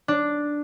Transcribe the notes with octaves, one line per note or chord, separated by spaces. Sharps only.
D4